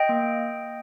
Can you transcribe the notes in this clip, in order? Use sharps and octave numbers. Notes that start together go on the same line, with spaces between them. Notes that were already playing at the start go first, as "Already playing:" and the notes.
Already playing: D#5 G5
A#3